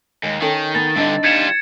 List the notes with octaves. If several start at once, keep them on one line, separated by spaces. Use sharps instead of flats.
D#2 G#3
D#3 C#4 A4 G5
B3 G#5 A6
G2 D3 C4 D4 D#4
G3 F4 G#6 C#7 E7